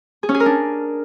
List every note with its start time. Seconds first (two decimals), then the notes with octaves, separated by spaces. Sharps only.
0.23 G#4
0.29 C#4
0.34 G#4
0.40 A#4
0.46 D4